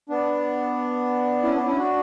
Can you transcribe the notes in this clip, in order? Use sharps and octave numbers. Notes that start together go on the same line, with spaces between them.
B3 D4
C#4 E4
B3 D4
C#4 E4
D4 F#4